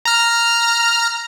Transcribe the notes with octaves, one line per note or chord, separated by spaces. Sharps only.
A#5 F6